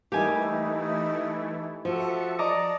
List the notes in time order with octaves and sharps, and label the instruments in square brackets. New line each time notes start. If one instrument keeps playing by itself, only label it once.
[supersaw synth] E3 A3 E4 [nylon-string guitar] G3 A#3 [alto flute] D#4 [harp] G4 G#5
[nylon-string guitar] F3 [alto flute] F#4 [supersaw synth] A4 E5 C#7
[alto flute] D5 [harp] D#5 A#5 D6 [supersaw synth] A5